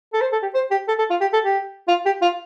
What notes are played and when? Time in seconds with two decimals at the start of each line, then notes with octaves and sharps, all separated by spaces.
0.13 A4
0.21 C5
0.32 A4
0.42 G4
0.54 C5
0.71 G4
0.88 A4
0.98 A4
1.10 F4
1.21 G4
1.33 A4
1.45 G4
1.88 F4
2.05 G4
2.22 F4